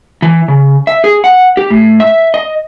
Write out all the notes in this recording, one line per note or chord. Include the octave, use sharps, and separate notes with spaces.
E3
C#3
E5
G#4
F#5
G4
A2
E5
D#5